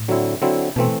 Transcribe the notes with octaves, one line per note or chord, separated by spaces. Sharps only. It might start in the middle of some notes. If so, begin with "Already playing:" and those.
Already playing: A2
D3 F#3 C4 E4
D3 F#3 C4 E4
B2 E3 A3 C4